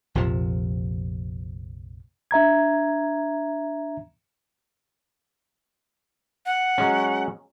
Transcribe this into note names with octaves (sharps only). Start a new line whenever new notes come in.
A#1 F2 C3 F3
D4 E5 A#5 G#6
F#5
F#3 G#3 C#4